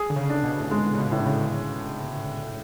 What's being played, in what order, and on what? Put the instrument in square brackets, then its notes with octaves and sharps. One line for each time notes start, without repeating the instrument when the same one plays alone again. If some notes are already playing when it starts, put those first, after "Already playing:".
Already playing: [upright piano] G#4
[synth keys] D3
C#3
[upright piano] D4
[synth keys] B2
A2
[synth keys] G#2 [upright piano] G#3
[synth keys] C#3
B2
[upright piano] A2
[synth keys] D3
C#3